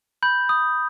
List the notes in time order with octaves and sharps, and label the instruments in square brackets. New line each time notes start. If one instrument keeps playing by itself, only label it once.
[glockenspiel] B5 G6
D#6